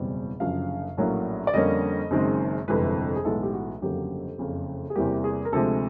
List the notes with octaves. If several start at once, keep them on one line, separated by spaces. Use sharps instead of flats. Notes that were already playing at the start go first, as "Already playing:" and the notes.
Already playing: F#1 E2 B2 G3 C4
F#1 F#2 D3 F3 F5
A#1 A2 F#3 A#3 C#4
D5
F2 D3 G3 A#3 C#4 D#5
F#1 F#2 D#3 G#3 C4
G1 F2 C3 E3 G#3 B4
G#4
B1 A2 E3 G#3 B3 A4
G4
F#4
G1 F2 C#3 F#3 A#3 G4
F#1 F2 C#3
G#4
E2 C3 E3 G3 A#3 G4
G#4
A#4
D2 C3 F3 G#3 A4